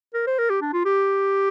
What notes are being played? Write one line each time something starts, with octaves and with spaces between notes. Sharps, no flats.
A#4
C5
A#4
G4
D4
F4
G4